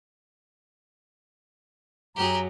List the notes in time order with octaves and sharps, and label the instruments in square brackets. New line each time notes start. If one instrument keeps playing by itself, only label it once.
[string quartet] F#2 F#3 [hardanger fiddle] G4 G#4 [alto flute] A#5